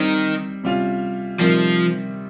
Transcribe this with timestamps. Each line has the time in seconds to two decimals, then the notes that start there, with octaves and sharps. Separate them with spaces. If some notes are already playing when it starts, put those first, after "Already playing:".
Already playing: D#3 G3 C4 D#4
0.63 C3 G3 C#4 F4
1.40 C3 D#3 F3 G3